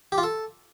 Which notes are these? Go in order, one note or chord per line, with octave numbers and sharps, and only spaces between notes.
G4
F4
A4